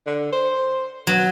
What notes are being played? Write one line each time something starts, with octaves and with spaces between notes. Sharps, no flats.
D3
C5
B2 F#3